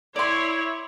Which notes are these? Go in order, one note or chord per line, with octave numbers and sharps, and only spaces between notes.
E4 C#5 D5 C6